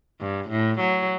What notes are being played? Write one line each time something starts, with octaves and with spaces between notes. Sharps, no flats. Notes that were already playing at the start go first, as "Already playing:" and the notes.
G2
A2
F#3